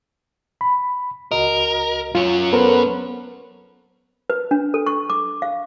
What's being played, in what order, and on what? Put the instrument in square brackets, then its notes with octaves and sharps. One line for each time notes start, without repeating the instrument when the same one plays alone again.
[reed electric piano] B5
[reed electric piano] C#2 F#4 D#5 [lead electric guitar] A#4
[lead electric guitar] F#2 C#4 [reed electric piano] F4
[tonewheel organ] B3 [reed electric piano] A4 A#4 C5
[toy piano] B4
D4
A4
C#6
D6
F5